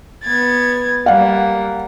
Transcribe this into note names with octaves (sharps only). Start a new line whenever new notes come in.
B3 G#6 A6
G3 A#3 F5 F#5